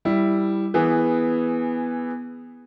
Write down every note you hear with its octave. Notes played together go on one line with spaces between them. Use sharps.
G3 E4
E3 B3 G#4